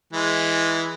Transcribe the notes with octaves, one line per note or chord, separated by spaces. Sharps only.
E3 G#3